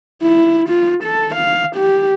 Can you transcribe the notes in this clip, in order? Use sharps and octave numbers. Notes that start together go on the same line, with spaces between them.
E4
F4
A4
F5
G4